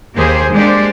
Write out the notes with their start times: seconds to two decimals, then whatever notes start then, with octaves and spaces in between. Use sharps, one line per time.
0.15 D#2 A#3 G4 G#4 C5
0.52 G#3 A#3 D4 G4 C5 D5